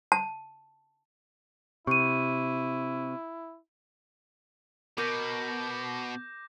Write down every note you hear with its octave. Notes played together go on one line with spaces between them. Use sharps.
A5
C3 E4 C#6 D#7
B2 A#4 D6 G6 A#6